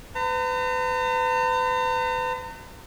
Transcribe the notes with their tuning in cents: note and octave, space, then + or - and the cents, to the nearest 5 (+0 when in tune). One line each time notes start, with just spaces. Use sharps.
B4 +40 A#5 -40